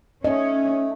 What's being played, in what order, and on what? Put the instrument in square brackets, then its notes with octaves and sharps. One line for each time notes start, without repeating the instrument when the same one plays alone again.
[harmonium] A3 [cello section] C#4 [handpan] D#5